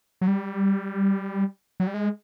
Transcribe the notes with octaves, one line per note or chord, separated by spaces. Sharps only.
F#3
G3
F#3
G3
G#3